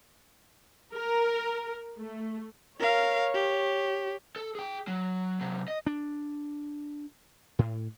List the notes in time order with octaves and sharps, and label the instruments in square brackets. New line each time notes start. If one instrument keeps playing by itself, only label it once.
[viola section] A#4
A3
[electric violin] A#4 F5 [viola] C#5
[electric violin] G4
[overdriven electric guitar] A4
G#4 G5
F#3
C3 F#3
D#5
[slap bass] D4
A2